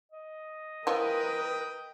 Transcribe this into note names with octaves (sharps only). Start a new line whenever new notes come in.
D#5
E3 F3 A#4 B4 G5 D#6